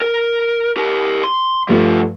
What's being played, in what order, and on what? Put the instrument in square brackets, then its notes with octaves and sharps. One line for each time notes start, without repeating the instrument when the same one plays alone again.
[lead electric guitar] A#4
G4 A#4
C6
[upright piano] G2 F3 A3 [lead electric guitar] G3 F4